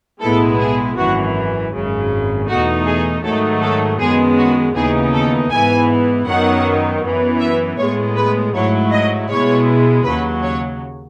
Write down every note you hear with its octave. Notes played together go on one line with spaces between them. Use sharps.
B1 A2 G#3 B3 E4 A4
G#4
G#1 F#2 E3 F#4
G#1 F#2 C#3
E2 B2 A3 D#4 F#4
G#4
G#2 D#3 F#3 A3 D#4 A4
A4
F#2 D#3 G#3 B3 G#4
F#4
D#2 C#3 E3 B3 D#4 G#4
A4
G#2 E3 B3 E4 G#5
F#2 D#3 F#3 B3 D#4 F#5
F#2 E3 B3
E5
A2 G#3 B3 C#5
B4
G#2 F#3 A3 E4 C#5
D#5
B2 G#3 B3 E4 C#5
D#2 C#3 F#3 B4
C#5